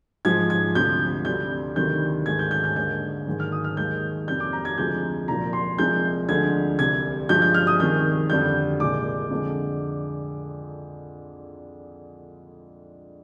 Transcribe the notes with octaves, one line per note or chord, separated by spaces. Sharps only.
G#2 F3 G#3 G#6
G#6
D2 C3 F3 G6
D2 C3 G3 G6
D2 C3 D#3 G3 G6
G#2 D#3 G#3 G#6
G6
G6
G6
D#2 D3 G#3 G6
G#2 D#3 G#3
F6
D#6
F6
D#2 D#3 G#3 G6
F2 C3 G3 G6
D6
A#5
G#6
D2 C3 F3 G#3 G6
C2 A#2 F3 A#5
C6
C2 C3 F3 G#3 G6
D2 D3 F3 G#3 G#6
C2 C3 G3 G#6
G2 F3 G#3 G6
G6
F6
D#6
C2 C3 D#3 G#3 G6
F2 D3 G3 G6
C2 A#2 G#3 D6
F2 D3 G#3